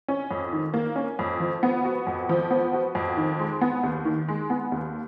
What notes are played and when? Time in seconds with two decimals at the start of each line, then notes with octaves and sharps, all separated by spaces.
0.08 C#4
0.31 F2
0.53 D#3
0.74 A#3
0.96 C#4
1.19 F2
1.40 F3
1.63 B3
1.84 F#4
2.07 F2
2.29 F3
2.51 B3
2.73 F#4
2.95 F2
3.17 D#3
3.39 G#3
3.61 B3
3.83 D#2
4.05 D#3
4.28 G#3
4.50 B3
4.72 D#2